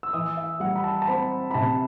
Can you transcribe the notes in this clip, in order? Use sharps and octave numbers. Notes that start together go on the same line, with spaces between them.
E6
E3 D#6
E5
G3 F#5
B5
A5
A5
C4 B5
B5
C3 A5